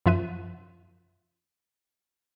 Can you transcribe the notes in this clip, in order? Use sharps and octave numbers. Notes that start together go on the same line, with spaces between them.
F#2 F3 F4 E5 F#6 D#7